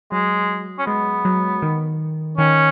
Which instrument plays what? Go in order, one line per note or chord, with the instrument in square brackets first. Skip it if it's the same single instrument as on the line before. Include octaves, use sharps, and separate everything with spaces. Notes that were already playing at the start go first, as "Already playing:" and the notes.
[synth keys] F#3 [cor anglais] G#3
[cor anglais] C#4
[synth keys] G#3 [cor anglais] B3
[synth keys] F#3
D#3
[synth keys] D#3 [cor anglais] C#4